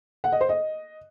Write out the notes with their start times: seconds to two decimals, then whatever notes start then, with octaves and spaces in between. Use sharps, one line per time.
0.24 F#5
0.32 D#5
0.41 C5
0.49 D#5